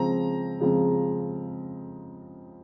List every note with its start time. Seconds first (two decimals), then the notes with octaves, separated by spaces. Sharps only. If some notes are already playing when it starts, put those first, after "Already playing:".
Already playing: C#3 F3 G#3 C4 A#5
0.60 C#3 F3 G#3 C4